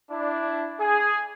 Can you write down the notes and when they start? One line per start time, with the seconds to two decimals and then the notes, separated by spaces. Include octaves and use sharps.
0.11 D4 E4
0.80 G#4 G#5